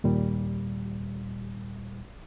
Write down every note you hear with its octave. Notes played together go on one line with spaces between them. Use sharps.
D#2 A#2 G3